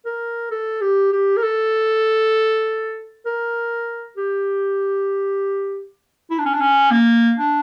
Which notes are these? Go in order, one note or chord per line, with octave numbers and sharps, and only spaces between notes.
A#4
A4
G4
G4
A#4
A4
A#4
G4
E4
D4
C#4
D4
C#4
A#3
D4